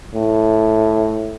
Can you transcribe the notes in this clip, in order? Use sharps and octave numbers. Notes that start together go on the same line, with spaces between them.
A2